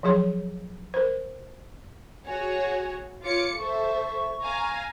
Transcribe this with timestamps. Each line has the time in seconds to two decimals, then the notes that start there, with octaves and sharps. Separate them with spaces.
0.03 F3 F#3 G#4 C#5 C6
0.94 A#4 C5
2.27 F#4 G#4 C#5 G#5
3.25 F4 C#5 D6 C#7
3.59 A4 C5 E5 C#6
4.44 F5 G#5 A#5